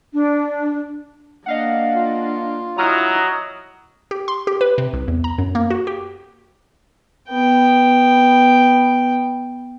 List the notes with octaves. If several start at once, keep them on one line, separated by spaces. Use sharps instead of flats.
D4
A#3 D4 D#5 F5 F#5
F4
F#3 E4 D#5 A#5 D#6 F6
G4
C6
G4
B4
C3
C2
E2
A#5
F#2
A#3
F#4
G4
B3 G5